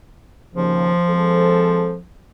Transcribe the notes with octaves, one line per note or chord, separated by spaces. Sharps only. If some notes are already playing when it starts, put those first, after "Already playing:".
D#2 C#3 F3
G#3 C4 A4